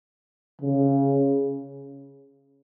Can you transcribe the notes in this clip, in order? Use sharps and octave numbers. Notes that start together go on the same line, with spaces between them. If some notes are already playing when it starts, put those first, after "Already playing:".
C#3